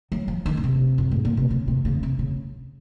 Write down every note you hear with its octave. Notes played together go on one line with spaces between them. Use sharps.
F#3
F3
D#3
C#3
C3
F#2
G#2
A#2
C3
C#3
C3
C#3
C3
C#3